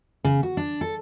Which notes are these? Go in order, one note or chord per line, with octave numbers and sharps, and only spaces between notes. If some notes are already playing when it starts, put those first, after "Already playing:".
C#3
F#4
D4
A4